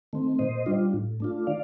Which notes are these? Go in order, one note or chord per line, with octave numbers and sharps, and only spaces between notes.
D#3 A3 C4
A#2 C5 D#5
G3 D4 F4
A2
A3 D4 F4
D#3 D5 F5